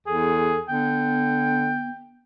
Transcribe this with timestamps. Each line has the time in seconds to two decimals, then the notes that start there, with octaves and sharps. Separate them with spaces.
0.07 E2 G#4 A4
0.69 D3 B3 G5